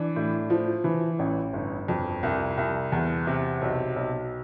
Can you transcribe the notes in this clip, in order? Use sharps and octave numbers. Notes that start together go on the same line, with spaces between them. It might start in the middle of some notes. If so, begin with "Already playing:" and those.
Already playing: E3 D4
A2
F3
E3
A1
G1
F2
C2
C2
E2
C3
B1
B1